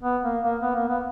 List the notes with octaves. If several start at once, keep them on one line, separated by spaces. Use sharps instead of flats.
B3
A#3
A#3
B3
A#3
B3